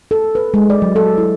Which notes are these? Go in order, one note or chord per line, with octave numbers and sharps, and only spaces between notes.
A4
B4
G#3
D5
F#3
A4
E4